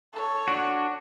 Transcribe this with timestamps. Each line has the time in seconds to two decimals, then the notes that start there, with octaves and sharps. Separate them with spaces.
0.13 A4 C#5
0.48 D4 F#4